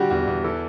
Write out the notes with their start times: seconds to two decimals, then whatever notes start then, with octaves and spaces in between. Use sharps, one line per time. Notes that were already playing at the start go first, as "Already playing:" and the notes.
Already playing: D3 G3 F#4 G4
0.10 E2 F#4
0.27 E2
0.44 E3 A4